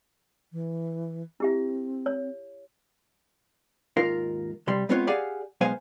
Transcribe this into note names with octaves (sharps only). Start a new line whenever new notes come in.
E3
C4 E4 G4 E5
C#5
D#2 G#2 F4 A#4 F5
C3 G3 C6
G#3 B3 C4 F4 B4 C#5
G4 G#4 D5 F5 F#5 G#5
B1 G#3 B3 C5 F5 G#5